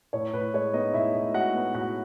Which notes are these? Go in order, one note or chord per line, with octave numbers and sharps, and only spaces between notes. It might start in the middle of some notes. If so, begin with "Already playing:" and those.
A2 C#5
A2 B4
G#3 C#5
B3 D#4 D#5
A2 E4 E5
A2
G#3 F#4 F#5
B3
A2 F#4 F#5